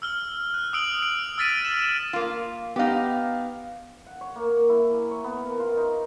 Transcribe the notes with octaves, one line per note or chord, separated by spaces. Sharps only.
E6 F6 G7
F#6
D#6 E6 D7 F#7
D7
E6 F6 A6 B6 D7 D#7
E7
A#3 F4
B3 D#4 G4 F5
F#5
C#5
A#3
C#5
E4
G#5
C#5
B3
A#4
F4
D#4